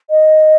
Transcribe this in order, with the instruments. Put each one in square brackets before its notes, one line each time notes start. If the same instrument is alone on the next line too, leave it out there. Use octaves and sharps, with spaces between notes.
[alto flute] D#5